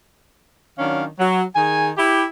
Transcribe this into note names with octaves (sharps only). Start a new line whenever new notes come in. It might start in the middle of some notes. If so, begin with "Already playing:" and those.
D#3 F#3 C#4 D4 F5
F#3
D#3 G#4 G#5
E4 G4